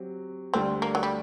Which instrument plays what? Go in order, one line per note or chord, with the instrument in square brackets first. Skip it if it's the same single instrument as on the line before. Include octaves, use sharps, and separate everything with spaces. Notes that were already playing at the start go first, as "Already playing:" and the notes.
Already playing: [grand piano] F#3 C4 G4
[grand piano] D2 D3 G3 D4 [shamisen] C4
[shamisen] A#3
F#3
G3